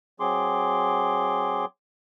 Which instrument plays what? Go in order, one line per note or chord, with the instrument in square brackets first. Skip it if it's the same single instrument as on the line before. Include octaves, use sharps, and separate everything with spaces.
[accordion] F#3 C4 G#4 C6 D6